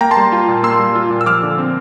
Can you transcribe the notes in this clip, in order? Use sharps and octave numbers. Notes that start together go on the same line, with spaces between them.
A#3 G5 A#5
A5 C6
G3
F4
A#2
A#3 C6 E6
G3
F4
A#2
E6
F3 D6 F6
D3
C4